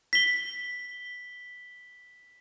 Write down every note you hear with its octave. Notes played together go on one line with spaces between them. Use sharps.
B6 G7